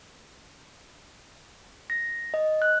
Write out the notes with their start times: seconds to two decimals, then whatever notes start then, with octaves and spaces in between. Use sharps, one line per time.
1.90 A#6
2.34 D#5
2.62 F#6